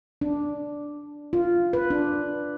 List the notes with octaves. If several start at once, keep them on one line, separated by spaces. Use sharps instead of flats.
D4
F4
B4
D4